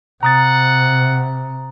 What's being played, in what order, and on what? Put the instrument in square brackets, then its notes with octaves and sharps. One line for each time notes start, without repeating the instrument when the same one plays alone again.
[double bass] C3 [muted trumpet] F#5 [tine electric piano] A#5 D#6 A6